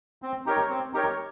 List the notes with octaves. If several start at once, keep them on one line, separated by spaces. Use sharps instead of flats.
C4
D#4 G4 A#4 C#5
C4
D#4 G4 A#4 C#5